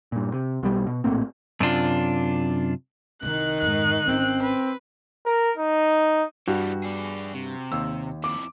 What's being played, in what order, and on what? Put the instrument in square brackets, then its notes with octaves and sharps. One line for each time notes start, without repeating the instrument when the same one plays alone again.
[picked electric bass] G2 A#2
C3
B1 B2 G3
B2
A#1 A2 A#3 C4
[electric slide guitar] F#2 C3 D4 F4
[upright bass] C2 E4 [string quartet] D#3 D#4 [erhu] F#6
[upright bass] F2 G#2 [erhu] F#6
[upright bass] G#1 C#4 [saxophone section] C4
[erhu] B4
[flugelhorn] A#4
D#4
[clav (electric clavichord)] G2 [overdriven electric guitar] E3 G3 [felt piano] F#4
[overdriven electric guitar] G#4 D5
C3
[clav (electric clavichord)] D#2 [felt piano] E6
[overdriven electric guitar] F2 E4 [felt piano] D6